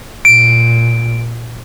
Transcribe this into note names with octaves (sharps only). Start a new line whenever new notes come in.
A#2 D7